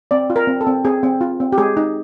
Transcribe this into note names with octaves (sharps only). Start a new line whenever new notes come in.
C4 D5
F4
A#4
C4
A4
C4
C4 G#4
C4
F4
C4
G4
G#3 G#4
D#4